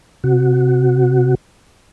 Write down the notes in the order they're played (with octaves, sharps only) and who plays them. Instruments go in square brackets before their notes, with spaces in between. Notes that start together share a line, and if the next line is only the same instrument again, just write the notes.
[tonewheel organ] C3 F#4